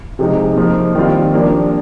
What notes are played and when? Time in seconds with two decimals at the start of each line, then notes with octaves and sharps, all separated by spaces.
0.19 C3 F3 G#3 D#4
0.56 F3 A#3 D#4 A#4
0.95 D#3 G3 C4 F4
1.34 F3 A#3 D4 G4